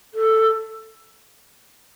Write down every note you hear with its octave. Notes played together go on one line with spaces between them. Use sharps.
A4